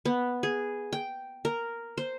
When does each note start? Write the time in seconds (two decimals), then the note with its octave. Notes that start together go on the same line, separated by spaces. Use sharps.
0.05 B3
0.43 G#4
0.93 G5
1.45 A#4
1.98 C5